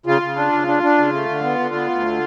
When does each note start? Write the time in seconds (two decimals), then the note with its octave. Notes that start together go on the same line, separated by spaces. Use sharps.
0.06 C#3 F4
0.22 C#3
0.36 D4
0.52 C#3
0.67 D4
0.83 D4
0.98 C#3
1.13 A3
1.29 D3
1.43 B3
1.59 D3
1.75 B3
1.90 D2
2.05 D3